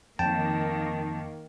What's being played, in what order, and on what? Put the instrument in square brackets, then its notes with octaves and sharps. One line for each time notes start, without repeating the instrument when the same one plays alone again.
[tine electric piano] F2 G5 A5 [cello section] D#3 A#3